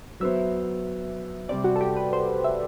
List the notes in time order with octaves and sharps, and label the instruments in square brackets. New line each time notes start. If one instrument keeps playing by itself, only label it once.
[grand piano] F#3 B3 F#4 C5 [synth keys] E5
[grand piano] C3 G3 C4 [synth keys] D5
[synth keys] F#4
A4
G4
B4
C5
E5